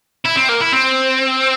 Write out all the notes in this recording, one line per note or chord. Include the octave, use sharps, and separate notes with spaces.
E4
C4
A#3
E4
C4